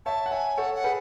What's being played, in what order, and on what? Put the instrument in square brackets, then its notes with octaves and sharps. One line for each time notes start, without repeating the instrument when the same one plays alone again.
[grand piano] C#5 E5 [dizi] A5
[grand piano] F#5
[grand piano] C#5 E5 [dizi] G#5
[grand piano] A4 C#5 [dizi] F#5
[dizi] F#5
[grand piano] G#4 B4